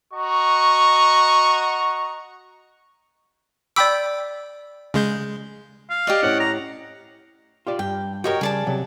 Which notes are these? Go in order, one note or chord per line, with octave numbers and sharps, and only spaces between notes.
F#4 D#5 A#5 C#6
D5 G5 B5 D6 E6
C#3 G#3 G6
F5
G4 D5 D#5
A2 C#4 F#5
A#5
F4 G4 D5
G2 G5
F#4 G4 A#4 C#5 D#5 G5
C#3 G3 G#4 D5 A5
C3 F#3